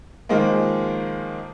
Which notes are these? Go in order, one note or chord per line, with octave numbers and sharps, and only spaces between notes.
D#3 F3 G#3 A#3